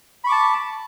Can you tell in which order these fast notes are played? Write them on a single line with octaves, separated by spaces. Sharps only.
B5 C#6 D6 A5